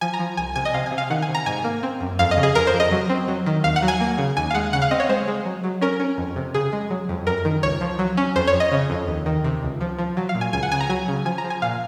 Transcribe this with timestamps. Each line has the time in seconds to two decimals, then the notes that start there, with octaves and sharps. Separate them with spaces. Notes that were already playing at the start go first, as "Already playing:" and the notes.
0.01 F3 G#5
0.14 A#5
0.19 F3
0.37 C2 G#5
0.56 C3 G#5
0.65 D#5
0.74 C3 F5
0.86 G#5
0.92 C3
0.98 F5
1.10 D#3 F#5
1.22 G#5
1.28 C3
1.35 A#5
1.46 G#2 G#5
1.64 A#3
1.83 C4
2.01 F#2
2.19 F2 F5
2.31 D#5
2.37 C#3
2.43 G#4
2.55 F2 A#4
2.67 C5
2.74 F2
2.80 D#5
2.91 F#3
3.09 C4
3.28 F#3
3.46 D#3
3.64 D#2 F5
3.76 F#5
3.82 F#3
3.88 G#5
4.00 A#3
4.18 C#3
4.37 D#2 G#5
4.51 F5
4.55 G#3 F#5
4.73 C#3 F#5
4.82 F5
4.91 C4 D#5
5.00 C#5
5.09 G#3 C5
5.28 G#3
5.45 F#3
5.64 F#3
5.81 C#4 A#4
6.00 C#4
6.18 F2
6.36 C3
6.54 C#3 G#4
6.73 G#3
6.90 F#3
7.09 F2
7.27 F#2 A#4
7.45 D#3
7.63 C#2 C#5
7.81 F3
7.99 F#3
8.17 C#4
8.35 F2 C5
8.47 C#5
8.54 F2
8.60 D#5
8.72 C#3
8.90 F2
9.08 D#2
9.26 D#3
9.44 C3
9.63 C#2
9.81 F3
9.99 F3
10.17 F#3
10.29 F5
10.35 A#2
10.41 G#5
10.53 C#2 G#5
10.63 F#5
10.72 C#3 G#5
10.81 A#5
10.90 F#3 G#5
11.08 C#3
11.25 F3 G#5
11.38 A#5
11.44 F3
11.50 G#5
11.62 A#2 F5